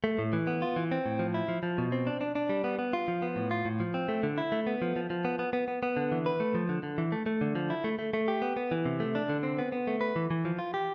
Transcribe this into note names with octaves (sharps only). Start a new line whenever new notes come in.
A3
A2
E3
B3
F4
E3
C4
A2
F3
E4
F3
F3
B2
C4
D4
D4
D4
G3
B3
B3
F4
F3
B3
A2
F4
A2
F3
C4
A3
D3
E4
A3
B3
F3
F3
F3
B3
B3
B3
B3
B3
D3
E3
B4
A3
F3
D3
D3
E3
A3
A3
D3
F3
E4
A3
A3
A3
G4
B3
B3
E3
C3
A3
D4
D3
C4
B3
B3
A3
B4
E3
E3
F3
F4
G4